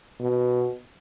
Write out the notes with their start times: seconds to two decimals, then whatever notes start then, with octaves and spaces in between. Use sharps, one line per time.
0.20 B2